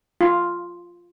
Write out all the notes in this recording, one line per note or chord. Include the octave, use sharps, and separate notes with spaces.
F4